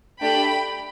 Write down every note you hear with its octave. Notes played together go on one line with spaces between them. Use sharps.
A3 D4 G4 G5 B5